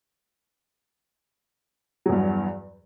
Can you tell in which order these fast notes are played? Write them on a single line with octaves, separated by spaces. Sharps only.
F#3 E2 G2